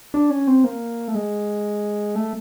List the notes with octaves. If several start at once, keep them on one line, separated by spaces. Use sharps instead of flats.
D4
C#4
C4
A#3
A3
G#3
A3